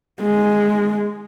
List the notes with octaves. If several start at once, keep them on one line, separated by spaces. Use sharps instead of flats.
G#3